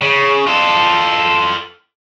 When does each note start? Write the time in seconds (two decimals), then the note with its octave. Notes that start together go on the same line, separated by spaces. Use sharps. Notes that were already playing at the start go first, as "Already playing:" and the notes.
0.01 C#3
0.47 F4 A4